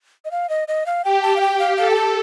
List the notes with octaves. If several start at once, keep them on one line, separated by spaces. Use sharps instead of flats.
D#5
F5
D#5
D#5
F5
G4 G5
A5
F5
G4 G5
F5
A4 F5
G5
A5